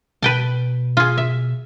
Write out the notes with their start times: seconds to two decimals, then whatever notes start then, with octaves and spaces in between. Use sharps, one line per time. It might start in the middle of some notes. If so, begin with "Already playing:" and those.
0.22 B2 B4 G5 A5
0.97 F4 G#4
1.18 E5